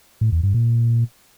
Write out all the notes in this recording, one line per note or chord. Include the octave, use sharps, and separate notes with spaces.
A2
E2
G2
A#2